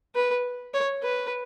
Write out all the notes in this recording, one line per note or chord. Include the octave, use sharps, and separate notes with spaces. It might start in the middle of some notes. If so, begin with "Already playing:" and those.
B4
C#5
B4